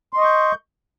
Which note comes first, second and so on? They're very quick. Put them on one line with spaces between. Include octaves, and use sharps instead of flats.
C6 D#5 C#6 G6